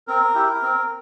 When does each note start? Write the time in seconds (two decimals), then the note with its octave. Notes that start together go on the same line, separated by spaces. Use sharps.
0.08 C4 A#4
0.35 E4 G4
0.63 C4